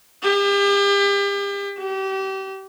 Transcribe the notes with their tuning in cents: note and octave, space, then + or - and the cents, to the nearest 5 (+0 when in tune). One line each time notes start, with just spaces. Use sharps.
G4 +35
G4 -30